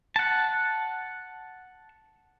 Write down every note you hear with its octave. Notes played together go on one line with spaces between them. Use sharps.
F#5 A5